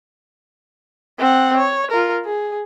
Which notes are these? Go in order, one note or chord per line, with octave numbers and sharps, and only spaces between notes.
C4 F#5
C#5
F4 A#4
G#4